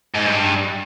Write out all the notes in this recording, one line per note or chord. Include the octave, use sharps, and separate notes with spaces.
G#2
G2